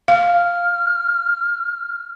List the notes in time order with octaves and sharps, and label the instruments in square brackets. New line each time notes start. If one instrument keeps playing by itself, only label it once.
[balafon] F5 [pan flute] F6